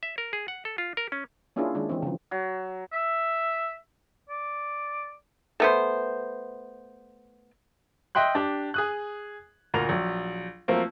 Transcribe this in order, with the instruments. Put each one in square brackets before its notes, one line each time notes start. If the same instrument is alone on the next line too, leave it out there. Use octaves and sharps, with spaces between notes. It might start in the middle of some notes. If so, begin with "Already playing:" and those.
[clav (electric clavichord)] E5
A#4
G#4
F#5
A4
F4
A#4
C#4
[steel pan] A#3 C#4 D4 E4 F4 G#4
D#3 G#3 D4
E3 C4
C#3 F3
[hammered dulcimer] F#3
[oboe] E5
D5
[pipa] A3 B3 C5
[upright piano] D#5 E5 G5 C6 F#6
D4 G4
G#4 D#6 F#6
D2 A#2 A#4 F7
A#1 F#3
F3 F#3 A3 A#3 C4